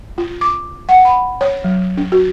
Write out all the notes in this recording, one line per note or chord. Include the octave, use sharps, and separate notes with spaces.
F4
D6
F#5
B5
C#5
F#3
D4
F#4